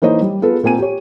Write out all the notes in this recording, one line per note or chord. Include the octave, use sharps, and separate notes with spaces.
E3 A#3 D#4 C5 C#5 D#5
G3
B3 F4 G#4 A4 B4
A#2 A#3 C4 G#5 D#7
G4 C#5